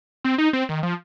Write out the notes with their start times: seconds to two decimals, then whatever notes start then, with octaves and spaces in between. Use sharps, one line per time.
0.24 C4
0.38 D#4
0.53 C4
0.69 D#3
0.83 F3